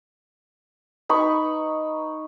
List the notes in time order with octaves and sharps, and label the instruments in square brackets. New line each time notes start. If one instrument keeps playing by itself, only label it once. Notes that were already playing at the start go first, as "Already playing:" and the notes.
[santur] D#4 B5 C#6 [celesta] B4 D#6